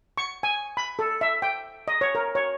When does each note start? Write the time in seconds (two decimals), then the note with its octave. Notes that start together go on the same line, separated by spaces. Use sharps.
0.18 C#6
0.43 G#5
0.77 B5
0.99 A4
1.21 E5
1.42 G5
1.88 D#5
2.01 C#5
2.15 A#4
2.35 C#5